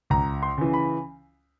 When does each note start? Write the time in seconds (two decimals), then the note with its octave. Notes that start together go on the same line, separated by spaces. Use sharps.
0.10 C#2 A#5
0.43 C6
0.58 C#3 E3
0.73 B5